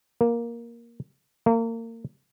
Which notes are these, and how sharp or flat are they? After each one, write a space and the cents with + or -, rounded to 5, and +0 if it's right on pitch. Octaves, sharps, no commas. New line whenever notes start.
A#3 +10
A#3 -30